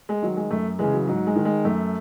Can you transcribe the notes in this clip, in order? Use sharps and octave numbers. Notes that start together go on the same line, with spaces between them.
G#3
D#3 F#3
G#3
F#2 A3
C#3 E3 G#3
F#3
G#2 F#3
G#3
D#3
G#3
F#2 A3